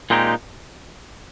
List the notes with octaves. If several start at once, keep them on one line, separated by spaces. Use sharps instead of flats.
A#2 G#3 C4 D#4 G4